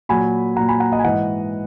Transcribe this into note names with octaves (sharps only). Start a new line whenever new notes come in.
A#2 F#3 G#5 B5
A#2 F#3 F#5 A#5
G#5 B5
F#5 A#5
D#5 F#5
G#5
G#2 E3 D#5 F#5